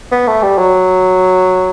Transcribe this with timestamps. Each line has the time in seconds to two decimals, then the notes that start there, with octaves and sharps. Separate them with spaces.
0.11 B3
0.27 A3
0.43 G3
0.58 F#3